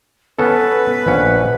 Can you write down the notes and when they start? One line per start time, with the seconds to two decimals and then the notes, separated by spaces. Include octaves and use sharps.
0.39 B3 C#4 A4 B4
1.06 A#1 C#4 F#5